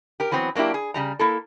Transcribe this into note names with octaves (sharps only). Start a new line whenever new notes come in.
G4 A#4
E3 F#3 B3 C4
F#3 A#3 D4 E4 G4
G#4
C#3 G3 A#5
A#3 E4 A4